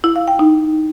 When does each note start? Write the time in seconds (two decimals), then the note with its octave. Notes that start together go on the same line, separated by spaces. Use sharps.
0.04 E4
0.16 F5
0.28 G5
0.39 D#4